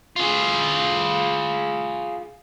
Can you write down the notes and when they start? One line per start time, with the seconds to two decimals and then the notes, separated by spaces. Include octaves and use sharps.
0.16 F4 G#4